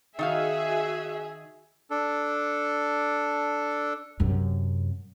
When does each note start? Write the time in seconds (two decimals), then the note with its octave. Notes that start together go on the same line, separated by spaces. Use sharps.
0.19 D#3 D#4 F#4 G#4 E5 F5
1.90 D4 A4
4.20 F#2 C3